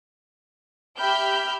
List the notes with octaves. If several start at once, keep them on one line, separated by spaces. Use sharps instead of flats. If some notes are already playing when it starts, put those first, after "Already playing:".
G4 E5 G5 B5 F6 G6